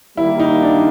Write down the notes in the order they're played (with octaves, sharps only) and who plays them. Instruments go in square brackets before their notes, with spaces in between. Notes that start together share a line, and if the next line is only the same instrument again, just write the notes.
[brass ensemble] D#3 G3 A#3 [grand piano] E4
[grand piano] D#4
D4